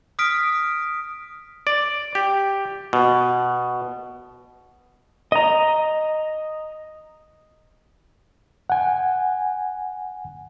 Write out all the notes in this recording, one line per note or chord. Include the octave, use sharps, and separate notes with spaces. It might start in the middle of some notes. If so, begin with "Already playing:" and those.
D#6 F6 B6 D7
D5
G4
B2
D#5 A#5
F#5 G#5